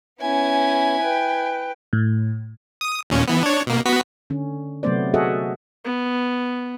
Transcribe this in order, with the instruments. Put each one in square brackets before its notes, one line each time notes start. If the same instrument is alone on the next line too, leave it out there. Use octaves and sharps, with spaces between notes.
[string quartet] B3 C#4 [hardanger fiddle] E4 G#5
[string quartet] B4 G5
[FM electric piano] A2
[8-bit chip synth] D#6
D#2 A#2 C#4
E3 B3
D4 C#5
B2 A#3
B3 F#4 B6
[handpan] D3 C#4
C3 F#3 A3 B3 C5 D5
F#4 G#4 A4 D#5 E5 F#5
[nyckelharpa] B3